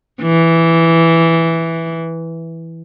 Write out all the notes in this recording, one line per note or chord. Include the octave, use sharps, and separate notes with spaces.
E3